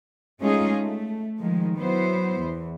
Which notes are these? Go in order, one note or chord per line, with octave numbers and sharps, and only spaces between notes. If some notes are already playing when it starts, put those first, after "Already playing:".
G#3 A3 C#4 D#4 F4 G#4
A3
D#3 F3 G#3
F#3 B3 E4 C5
E2